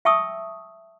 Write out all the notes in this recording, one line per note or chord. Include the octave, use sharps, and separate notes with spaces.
E5 G5 A5 C#6 D#6 E6